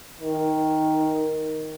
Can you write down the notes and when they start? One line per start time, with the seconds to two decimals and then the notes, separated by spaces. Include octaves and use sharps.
0.21 D#3